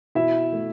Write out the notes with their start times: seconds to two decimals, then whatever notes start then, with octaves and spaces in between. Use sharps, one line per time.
0.15 B2 E4 E5
0.52 A3